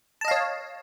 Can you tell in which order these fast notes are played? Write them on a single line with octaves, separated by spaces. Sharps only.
A5 D#5 F5 C#5